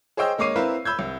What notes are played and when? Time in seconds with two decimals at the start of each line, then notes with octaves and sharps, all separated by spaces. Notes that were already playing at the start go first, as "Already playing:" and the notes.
0.17 G#4 C5 C#5 D#5 G5 E6
0.38 G#3 A#3 C#5 D6 C7 D#7
0.56 C4 E4 A#4 B4 F5
0.85 B5 E6 G6 G#6
0.99 C2